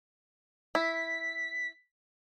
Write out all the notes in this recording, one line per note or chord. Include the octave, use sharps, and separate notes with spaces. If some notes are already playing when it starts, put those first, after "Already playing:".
E4 B6